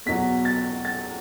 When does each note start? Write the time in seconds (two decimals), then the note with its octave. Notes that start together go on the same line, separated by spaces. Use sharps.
0.06 E2 B2 F#3 B6
0.45 A6
0.85 A6